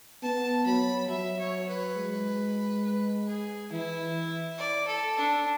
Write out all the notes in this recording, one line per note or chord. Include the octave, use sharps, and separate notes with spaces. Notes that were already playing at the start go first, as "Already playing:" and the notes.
B3 A5
F#3 B5
F#3 E5
C#5
B4
G#3
B4
G#4
E3 E4
D5
A4
D4